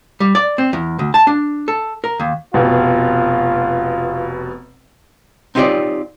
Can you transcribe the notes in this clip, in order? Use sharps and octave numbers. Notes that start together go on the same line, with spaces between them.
G3
D5
C4
E2
D2
A5
D4
A4
A#4
D#2
F1 B2 F4
C4 D#4 F4 G4 C#5 D5